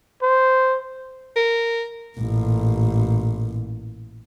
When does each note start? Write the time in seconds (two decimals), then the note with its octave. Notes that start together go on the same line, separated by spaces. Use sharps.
0.22 C5
1.36 A#4
2.18 A1 A#2